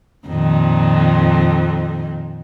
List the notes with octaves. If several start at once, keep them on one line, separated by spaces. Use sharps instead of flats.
F2 A#2 D#3